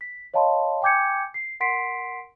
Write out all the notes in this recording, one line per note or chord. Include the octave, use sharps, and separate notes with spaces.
B6
C#5 D#5 F5 A5 B5 C6
G5 G#5 D6 G6 G#6 C#7
C7
A#4 F#5 C6 B6 C7 D7